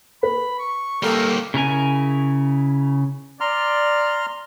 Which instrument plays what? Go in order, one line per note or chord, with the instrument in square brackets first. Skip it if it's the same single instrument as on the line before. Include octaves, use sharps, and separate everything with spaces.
[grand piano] B4 [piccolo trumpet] B5
[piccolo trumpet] C#6
[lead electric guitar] G3 A#3 [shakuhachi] A4 [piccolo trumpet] A#4
[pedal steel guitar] C#3 E4 A#4 G#5
[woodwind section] D5 [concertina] A#5 C6 F6